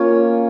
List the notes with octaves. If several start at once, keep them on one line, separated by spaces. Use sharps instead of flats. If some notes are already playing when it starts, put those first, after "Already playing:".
Already playing: A#3 C#4 F4 C#5